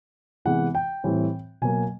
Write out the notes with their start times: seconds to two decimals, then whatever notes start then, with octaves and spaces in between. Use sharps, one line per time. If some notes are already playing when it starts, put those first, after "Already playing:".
0.45 C3 E3 G#3 B3 F#5
0.75 G5
1.04 A2 E3 G3 C4
1.62 B2 F#3 A#3 G#5